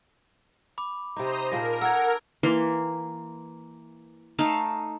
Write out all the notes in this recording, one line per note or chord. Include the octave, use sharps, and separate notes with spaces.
B5 D6
C3 D#4 C5 A#5 D#6
A#2 G#4 A#4 D#5 A5 A#6
A4 F#5 E6 G#6
E3 A#3 C6
A3 D#4 F5